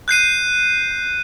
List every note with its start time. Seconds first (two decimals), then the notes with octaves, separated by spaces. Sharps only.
0.08 F#6 G6 C7 D#7